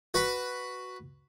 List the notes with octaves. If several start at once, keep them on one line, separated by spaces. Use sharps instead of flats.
F#4 B4 B5